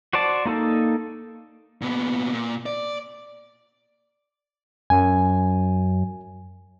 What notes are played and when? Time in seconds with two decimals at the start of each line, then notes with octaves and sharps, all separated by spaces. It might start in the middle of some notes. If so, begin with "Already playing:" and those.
0.13 F#4 C5 D5 A5
0.46 A#3 D#4 A4
1.82 A#2 B3
2.33 A#2
2.66 D5
4.90 F#2 G#5